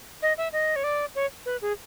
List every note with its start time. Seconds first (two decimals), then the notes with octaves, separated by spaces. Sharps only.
0.22 D#5
0.38 E5
0.53 D#5
0.76 C#5
0.84 D5
1.15 C#5
1.46 B4
1.62 G#4